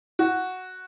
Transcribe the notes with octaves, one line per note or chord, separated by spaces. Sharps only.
F#4